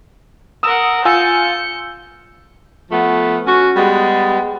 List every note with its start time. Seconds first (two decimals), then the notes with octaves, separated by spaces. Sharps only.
0.63 A#4 F#5 D#6 E6 E7
1.05 F4 G#5 E6 G6 C#7
2.91 F3 A3 B3
3.47 C#4 F#4
3.76 G3 G#3 B3